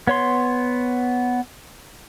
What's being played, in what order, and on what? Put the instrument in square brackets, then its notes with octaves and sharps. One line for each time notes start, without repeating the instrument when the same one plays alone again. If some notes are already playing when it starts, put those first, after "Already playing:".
[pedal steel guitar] B3 C#5 C6